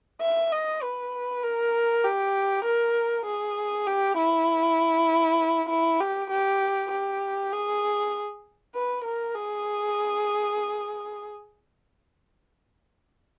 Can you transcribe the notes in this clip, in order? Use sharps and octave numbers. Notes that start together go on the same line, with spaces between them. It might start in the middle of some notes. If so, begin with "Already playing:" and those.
E5
D#5
B4
A#4
G4
A#4
G#4
G4
E4
E4
G4
G4
G4
G#4
B4
A#4
G#4